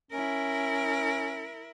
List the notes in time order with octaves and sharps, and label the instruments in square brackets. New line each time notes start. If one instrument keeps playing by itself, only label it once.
[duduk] C#4 [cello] E4 A#4